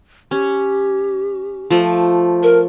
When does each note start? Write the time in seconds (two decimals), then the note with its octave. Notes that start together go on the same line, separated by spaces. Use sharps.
0.31 C#4 G4
1.70 F3 A3
2.43 A#4